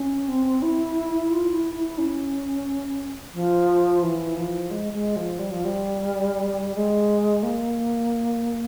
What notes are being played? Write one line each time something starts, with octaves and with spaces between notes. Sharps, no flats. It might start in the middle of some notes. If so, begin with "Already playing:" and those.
Already playing: C#4
C4
E4
F4
E4
E4
C#4
F3
E3
F3
G#3
G#3
F3
G3
F3
G3
G#3
A#3